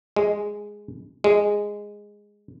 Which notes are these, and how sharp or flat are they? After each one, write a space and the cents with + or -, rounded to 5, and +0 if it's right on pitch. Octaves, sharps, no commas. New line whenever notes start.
G#3 -5
G#3 -10